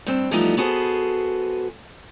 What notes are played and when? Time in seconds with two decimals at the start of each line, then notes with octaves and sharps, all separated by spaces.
0.06 G2 C4
0.31 E3 F3 G3 A3 B3 D#4
0.57 B3 F#4 G#4 A4 C5